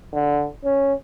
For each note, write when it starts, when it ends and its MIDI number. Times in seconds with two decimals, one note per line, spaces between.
0.14 0.47 50
0.65 0.94 61